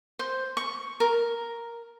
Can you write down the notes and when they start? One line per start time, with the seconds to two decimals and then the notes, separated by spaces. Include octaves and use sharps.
0.19 C5
0.57 C#6
1.00 A#4